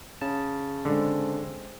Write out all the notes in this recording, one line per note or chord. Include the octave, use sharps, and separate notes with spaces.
C#3 A5
D3 G#3 C4